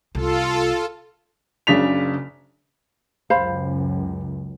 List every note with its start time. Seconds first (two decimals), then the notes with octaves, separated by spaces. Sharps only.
0.15 C2 F4 A4
1.67 F#1 C#3 D4 B6 F7
3.30 C#2 F#2 C5 F5 B5